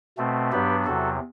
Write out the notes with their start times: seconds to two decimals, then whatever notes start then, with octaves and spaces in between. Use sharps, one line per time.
0.18 B2 A3 C4
0.52 G2 F#3 B3 D4 G4 B4
0.85 E2 C3 F#3 F#4 A4